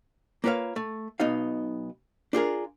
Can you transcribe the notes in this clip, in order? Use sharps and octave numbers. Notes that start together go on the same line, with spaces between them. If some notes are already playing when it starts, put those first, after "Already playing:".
A#3 F4 B4 C#5 F5
A3
B1 B3 D#4 F5
D4 F4 G#4 A#4